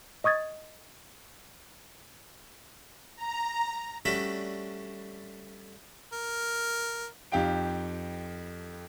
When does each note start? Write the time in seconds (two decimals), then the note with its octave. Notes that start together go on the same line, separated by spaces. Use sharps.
0.24 D#5 C#6 D#6 G#6 A6
3.15 A#5
4.05 G3 A3 C#4 D4 F#4 E5
6.13 A#4
7.32 F2 D#4 G4 F5 G5 D7